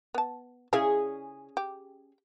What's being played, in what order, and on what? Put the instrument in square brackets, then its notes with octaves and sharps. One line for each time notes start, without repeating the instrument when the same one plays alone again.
[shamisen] B3 A5
[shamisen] C#3 E4 F5 [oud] C#4 G#4
[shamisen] G4